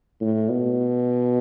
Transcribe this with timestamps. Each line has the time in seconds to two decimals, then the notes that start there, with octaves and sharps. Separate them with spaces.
0.21 A2
0.50 B2